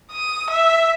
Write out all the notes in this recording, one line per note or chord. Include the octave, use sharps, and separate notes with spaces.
D#6
E5